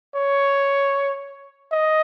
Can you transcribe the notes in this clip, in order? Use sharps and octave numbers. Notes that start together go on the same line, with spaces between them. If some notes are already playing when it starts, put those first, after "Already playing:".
C#5
D#5